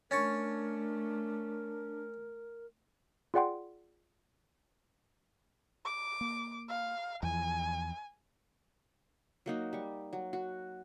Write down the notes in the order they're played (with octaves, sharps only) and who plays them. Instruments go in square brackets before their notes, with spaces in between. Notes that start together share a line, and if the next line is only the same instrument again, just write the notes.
[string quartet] A3 [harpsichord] C#4 A5 C#6 [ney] D4 [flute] A#4
[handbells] F4 G#4 D5 F#5 G5 C6
[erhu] D6
[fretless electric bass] A#3
[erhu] F5
[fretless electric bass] E2 F3 [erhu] G#5
[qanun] F#3 A#3 D#4 F#4
G3 C#6
F#3
F#4